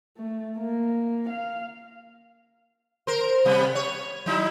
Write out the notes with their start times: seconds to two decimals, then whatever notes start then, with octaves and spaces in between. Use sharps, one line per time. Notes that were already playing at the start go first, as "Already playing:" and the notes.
0.17 A3
0.59 A#3
1.29 F5
3.07 A#4 C5
3.45 C3 G3 B3
3.75 C#5
4.26 F#3 D#4 E4